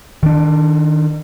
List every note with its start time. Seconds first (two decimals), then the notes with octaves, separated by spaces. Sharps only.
0.22 D#3 D4